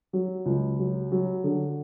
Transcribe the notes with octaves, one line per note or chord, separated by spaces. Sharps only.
F#3
C#2
F#3
F#3
D3